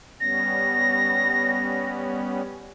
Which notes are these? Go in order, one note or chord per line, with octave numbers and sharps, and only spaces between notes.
G3 B3 C#4 A#6